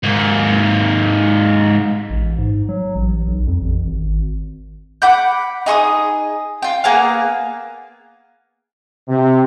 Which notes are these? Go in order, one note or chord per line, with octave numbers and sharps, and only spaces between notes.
G#2 A#3
A1
G#2
F#3
A1
B1
F2
A1
G#1
F#5 B5 D6 G6
D#4 G#4 C#6 D#6
F4 G5
A#3 B3 G#4 F5
C3